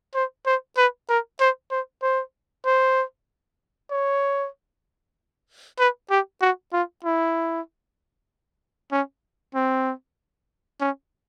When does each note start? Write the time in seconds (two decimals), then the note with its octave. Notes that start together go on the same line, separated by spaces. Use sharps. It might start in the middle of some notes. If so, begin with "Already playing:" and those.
0.15 C5
0.46 C5
0.77 B4
1.09 A#4
1.40 C5
1.71 C5
2.02 C5
2.66 C5
3.91 C#5
5.79 B4
6.10 G4
6.41 F#4
6.73 F4
7.04 E4
8.92 C#4
9.55 C4
10.81 C#4